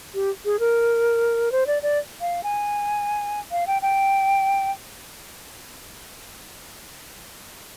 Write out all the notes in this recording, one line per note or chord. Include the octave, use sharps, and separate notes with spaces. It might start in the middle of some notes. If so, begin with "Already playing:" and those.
G4
G#4
A#4
C5
D5
D5
F5
G#5
F5
G5
G5